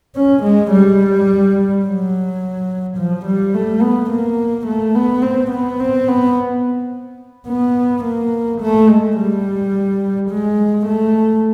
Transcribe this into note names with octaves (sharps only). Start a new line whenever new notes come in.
C#4
G#3
G3
F#3
F3
G3
A3
B3
A#3
A3
B3
C4
B3
C4
B3
B3
A#3
A3
G#3
G3
G#3
A3